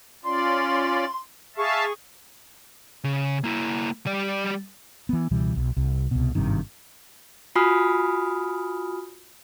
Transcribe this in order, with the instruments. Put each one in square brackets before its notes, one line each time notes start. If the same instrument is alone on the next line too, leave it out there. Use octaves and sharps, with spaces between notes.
[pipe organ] C#4 F4 D5 [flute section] C6
[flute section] G#4 C#6 [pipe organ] E5 F5 A5
[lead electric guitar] C#3
A#3 E4
G3 D5
[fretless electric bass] E3 B3
C#2 B2 E3 G3
B1
C2
C2 B2
G#1 G2 C3 D#3
[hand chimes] F4 F#4 G#5 B5 D#6 F6